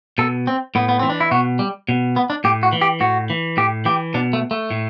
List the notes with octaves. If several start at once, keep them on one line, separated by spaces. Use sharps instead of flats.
B2 A4
C4
A2 B3
B3
E3 C4
D4
E4
B2 F#4
G3
B2
B3
D4
A2 G4
F#4
E3
G4
A2 F#4
E3
A2 G4
E3 G4
B2 D4
A3
A3
A2